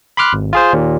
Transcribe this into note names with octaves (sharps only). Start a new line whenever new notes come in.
B5 C6 D6 F6 F#6
G#1
F4 G#4 C5
D#2 A#2